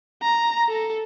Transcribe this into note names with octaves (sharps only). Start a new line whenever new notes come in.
A#5
A4